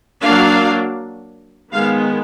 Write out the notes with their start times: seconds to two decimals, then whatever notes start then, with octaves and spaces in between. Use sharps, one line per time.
0.21 F#3 A#3 D4 F5
1.72 D#3 G#3 B3 F5